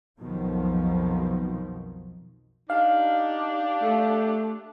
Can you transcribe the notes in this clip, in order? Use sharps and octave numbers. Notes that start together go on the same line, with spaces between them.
B1 F2 B2 D#3 F3
D4 D#4 G4 F5
A3